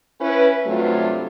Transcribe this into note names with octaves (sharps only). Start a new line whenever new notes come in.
C#4 E4 B4
G2 C3 F#3 A3 F4